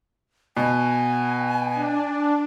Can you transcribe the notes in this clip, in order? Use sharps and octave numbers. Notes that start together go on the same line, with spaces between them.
B2 G#5
D4